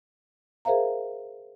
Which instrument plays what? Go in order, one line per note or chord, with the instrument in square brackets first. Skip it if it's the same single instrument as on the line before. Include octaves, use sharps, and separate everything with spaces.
[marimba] G#4 A#4 C5 E5 F5 A#5